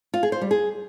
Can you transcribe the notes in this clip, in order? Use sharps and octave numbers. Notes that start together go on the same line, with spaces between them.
F4
G#4
C5
G3
G#4